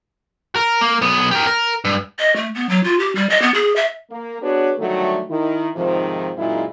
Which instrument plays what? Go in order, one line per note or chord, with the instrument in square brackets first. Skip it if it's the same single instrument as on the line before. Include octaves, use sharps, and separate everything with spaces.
[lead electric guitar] A#4
A#3
B1 B3
G4 A#4
A#4
G2
[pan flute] D#5
A3
B3
F#3
F4
G4
G3
D#5
B3
G#4
E5
[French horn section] A#3
B3 D4 F#4 G#4 B4 C#5
D3 D#3 F#3 G3 A3
D#3 E4
G#2 C3 D#3 F3
F#2 A#2 C#3 G#3 D#4 E4